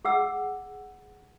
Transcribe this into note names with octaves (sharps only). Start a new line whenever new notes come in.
G#4 F#5 E6